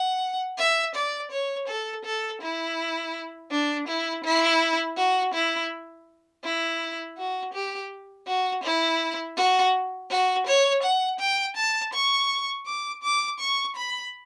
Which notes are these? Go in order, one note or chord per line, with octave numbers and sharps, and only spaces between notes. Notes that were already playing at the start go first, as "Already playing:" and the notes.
Already playing: F#5
E5
D5
C#5
A4
A4
E4
D4
E4
E4
F#4
E4
E4
F#4
G4
F#4
E4
F#4
F#4
C#5
F#5
G5
A5
C#6
D6
D6
C#6
B5